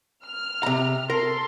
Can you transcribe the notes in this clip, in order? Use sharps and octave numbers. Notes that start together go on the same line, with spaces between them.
F6
C3 A#5
A4 A#4 C6